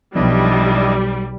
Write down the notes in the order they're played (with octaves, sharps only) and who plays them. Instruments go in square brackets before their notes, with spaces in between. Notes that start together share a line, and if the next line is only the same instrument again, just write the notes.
[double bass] B1 [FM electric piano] F3 B3 [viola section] G3 [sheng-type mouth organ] D4 E4 D#5